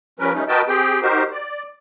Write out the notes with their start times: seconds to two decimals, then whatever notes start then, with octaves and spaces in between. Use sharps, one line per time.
0.20 F3 G3 C#4 A#4 B4
0.34 G3 A3 C#4 D#4
0.48 F#4 A#4 B4 D#5 G5 A5
0.68 C4 G4 G#4 G5
1.02 D#4 F#4 G4 A#4 C5
1.32 D5